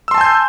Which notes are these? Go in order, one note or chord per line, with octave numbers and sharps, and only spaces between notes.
G#5 A5 C6 E6 G6